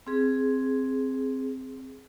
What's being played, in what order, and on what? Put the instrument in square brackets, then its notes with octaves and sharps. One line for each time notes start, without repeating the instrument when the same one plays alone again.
[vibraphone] C4 G#4